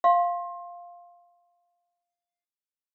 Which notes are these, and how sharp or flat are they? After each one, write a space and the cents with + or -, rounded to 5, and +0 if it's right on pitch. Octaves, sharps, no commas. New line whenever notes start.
F5 +0 C6 +25